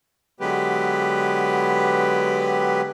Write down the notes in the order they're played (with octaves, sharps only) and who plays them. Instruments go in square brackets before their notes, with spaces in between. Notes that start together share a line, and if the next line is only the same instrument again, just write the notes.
[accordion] D3 F#3 G#3 B3 G4 B4